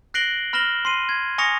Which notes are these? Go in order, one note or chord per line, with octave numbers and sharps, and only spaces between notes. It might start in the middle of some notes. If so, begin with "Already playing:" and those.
F#6 A#6 C7 D7 F#7 G7
B5 F6 A#6 E7 F#7 G7
C6 C7 D#7
G#6
G#5 C#6 D#6 A#6 C#7 F7